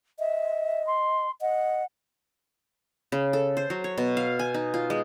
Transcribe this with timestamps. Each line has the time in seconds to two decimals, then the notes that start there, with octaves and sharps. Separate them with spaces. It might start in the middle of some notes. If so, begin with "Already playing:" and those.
0.19 D#5 E5
0.86 C6
1.41 D#5 F#5
3.12 C#3
3.33 A4
3.57 C5
3.70 F#3
3.84 C#5
3.98 B2
4.17 F5
4.39 G#5
4.54 D#4
4.74 F4
4.90 G#3